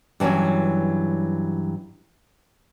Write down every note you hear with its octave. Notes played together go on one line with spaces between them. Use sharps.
G2 E3 F#3 C#4 F#4